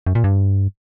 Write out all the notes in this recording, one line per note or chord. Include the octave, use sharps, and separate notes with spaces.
F#2
A#2
G2